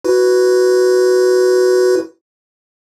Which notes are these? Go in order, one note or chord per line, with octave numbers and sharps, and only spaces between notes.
E4 F#4 B4